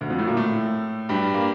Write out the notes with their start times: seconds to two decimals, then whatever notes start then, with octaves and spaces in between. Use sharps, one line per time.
0.01 D2 D3
0.09 F2 F3
0.18 A2 A3
0.27 A#2 A#3
0.37 A2 A3
1.09 G2 G3
1.34 A#3